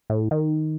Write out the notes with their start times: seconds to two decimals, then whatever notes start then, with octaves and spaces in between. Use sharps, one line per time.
0.10 A2
0.31 D#3